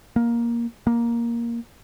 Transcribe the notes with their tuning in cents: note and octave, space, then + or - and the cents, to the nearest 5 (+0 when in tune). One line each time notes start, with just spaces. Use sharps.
A#3 +10
A#3 +10